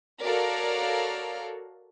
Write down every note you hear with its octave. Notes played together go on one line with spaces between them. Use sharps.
F#4 A4 A#4 C#5 D5 F5